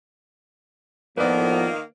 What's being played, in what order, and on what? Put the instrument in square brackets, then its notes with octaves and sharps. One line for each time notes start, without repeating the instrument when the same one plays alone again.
[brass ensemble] A2 F3 [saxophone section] D#3 A#3 [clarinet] B3 [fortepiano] B4 D5